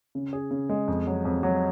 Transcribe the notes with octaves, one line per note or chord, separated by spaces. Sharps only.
C#3
G#4
C#3
G#3
F2
F#3
F2
F#3